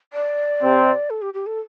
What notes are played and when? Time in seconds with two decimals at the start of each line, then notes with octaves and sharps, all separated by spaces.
0.13 D5
0.62 C3 C4
1.10 A4
1.22 G4
1.34 G4
1.46 A4